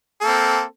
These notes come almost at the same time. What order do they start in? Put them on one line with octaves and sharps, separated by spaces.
A4 A#3 C4